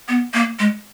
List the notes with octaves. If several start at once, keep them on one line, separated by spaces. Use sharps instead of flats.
B3
A#3
G#3